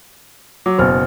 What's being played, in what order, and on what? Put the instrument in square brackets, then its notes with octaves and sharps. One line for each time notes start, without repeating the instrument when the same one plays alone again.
[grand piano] F#3 [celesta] D6
[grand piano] F#1 B2 [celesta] C5 F6